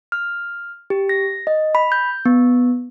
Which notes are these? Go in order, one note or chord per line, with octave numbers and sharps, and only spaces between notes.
F6
G4
A#6
D#5
B5
G6
B3